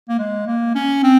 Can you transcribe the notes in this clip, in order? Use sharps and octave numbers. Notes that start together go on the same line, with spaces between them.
A#3
G#3
A#3
C#4
C4